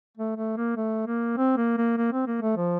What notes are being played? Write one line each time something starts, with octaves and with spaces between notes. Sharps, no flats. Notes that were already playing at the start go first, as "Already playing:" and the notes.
A3
A3
A#3
A3
A#3
C4
A#3
A#3
A#3
C4
A#3
A3
F3